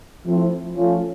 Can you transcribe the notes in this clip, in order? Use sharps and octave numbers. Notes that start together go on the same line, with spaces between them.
F3 A3 C4 E4
F3 A3 C#4 F4